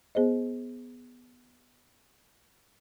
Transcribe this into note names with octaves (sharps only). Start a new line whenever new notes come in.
B3 G#4 C5 D#5